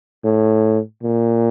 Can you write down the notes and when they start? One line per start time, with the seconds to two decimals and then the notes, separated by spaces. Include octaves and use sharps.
0.24 A2
1.03 A#2